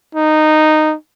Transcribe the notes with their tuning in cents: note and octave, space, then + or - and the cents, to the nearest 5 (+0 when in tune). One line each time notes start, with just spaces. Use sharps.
D#4 -10